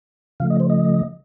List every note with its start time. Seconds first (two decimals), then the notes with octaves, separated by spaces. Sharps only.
0.40 C#3 F3 A3 F5
0.50 D#5
0.60 C5
0.70 D#5